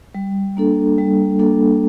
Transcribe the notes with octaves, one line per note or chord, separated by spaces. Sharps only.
G3
A#3 D4 A4
G3
A#3 D4 A4